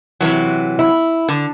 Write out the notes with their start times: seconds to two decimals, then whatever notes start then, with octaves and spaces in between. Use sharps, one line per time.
0.21 C3 E3 F#3
0.79 E4
1.29 D3